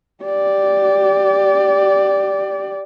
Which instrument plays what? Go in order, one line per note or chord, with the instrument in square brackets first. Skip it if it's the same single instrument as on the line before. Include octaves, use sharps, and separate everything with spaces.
[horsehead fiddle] G4 D5